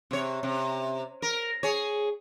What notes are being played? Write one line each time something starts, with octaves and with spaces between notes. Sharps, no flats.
C3 C#5
C3
A#4
G#4 C#5